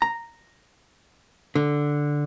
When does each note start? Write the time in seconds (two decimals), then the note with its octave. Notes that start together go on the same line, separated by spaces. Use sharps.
0.02 A#5
1.55 D3